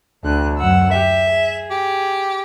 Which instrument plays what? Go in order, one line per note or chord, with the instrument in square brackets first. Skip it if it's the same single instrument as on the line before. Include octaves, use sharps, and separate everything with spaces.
[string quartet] D2 D3 F#6
F#2 F#5 E6
[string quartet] G4 [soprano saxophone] E5
[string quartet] G#4
[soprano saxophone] G4